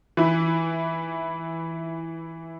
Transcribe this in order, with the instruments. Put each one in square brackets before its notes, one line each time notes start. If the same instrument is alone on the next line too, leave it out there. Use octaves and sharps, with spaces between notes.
[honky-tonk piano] E3 E4